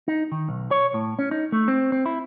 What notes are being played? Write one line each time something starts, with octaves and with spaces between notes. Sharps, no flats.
D#4
D#3
B1
C#5
A2
C#4
D#4
A3
C4
C4
E4